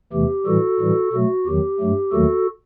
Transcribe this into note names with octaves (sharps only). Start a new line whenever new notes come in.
E2 C3 E3 A3 G4
A2 E3 G3 F#4 A4
A2 E3 G3
B2 F#3 A3 F#4
E2 D#3 F#3 G4
G2 F#3 A3
D#2 D#3 F#3 A3 F#4 A4